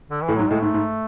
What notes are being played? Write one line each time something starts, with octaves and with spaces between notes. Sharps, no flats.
D3
E3
A2
G#2 F#3
A2 G#3
G#2 A3
G#2